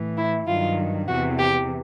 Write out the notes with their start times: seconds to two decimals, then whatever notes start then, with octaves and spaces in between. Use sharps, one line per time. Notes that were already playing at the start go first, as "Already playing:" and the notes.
Already playing: A2 E3
0.17 E4
0.47 G2 D#3 F#3 F4
1.07 E2 C3 E3 F#4
1.38 G4